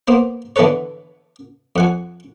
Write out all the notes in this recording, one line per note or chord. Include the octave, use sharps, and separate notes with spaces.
A#3 B3 C5
D3 E3 B3 A4 B4 C#5
F2 F#5 G#5